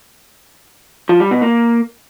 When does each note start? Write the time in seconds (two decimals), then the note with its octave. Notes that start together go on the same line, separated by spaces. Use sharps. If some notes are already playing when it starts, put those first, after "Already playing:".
1.09 F3
1.20 G3
1.31 B2
1.42 A#3